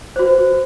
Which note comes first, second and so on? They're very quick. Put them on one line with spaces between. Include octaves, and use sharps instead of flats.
C5 F#4 B4